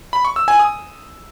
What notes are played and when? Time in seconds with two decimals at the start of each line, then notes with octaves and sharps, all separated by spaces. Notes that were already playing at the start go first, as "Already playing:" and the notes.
0.13 B5
0.25 C#6
0.36 E6
0.48 G#5
0.59 D#6